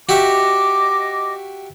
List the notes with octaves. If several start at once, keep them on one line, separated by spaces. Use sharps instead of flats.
F#4 G4 D#5 E5 D6